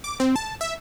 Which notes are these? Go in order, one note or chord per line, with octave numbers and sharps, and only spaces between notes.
D6
C4
A5
E5